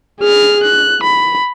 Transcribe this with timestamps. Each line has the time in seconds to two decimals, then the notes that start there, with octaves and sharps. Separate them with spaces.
0.20 G#4 F6
0.64 F#6
1.03 B5